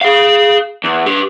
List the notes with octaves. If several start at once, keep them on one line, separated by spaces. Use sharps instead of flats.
G#4 F5
E2
G4 B4